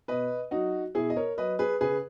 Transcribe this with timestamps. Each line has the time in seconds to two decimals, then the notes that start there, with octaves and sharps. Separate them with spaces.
0.08 B2 B4 D#5
0.51 F#3 D#4 F#4
0.95 B2 E4 G#4
1.10 D#5
1.16 A#4 C#5
1.38 F#3 B4 D#5
1.59 G#4 B4
1.81 C#3 G#4 B4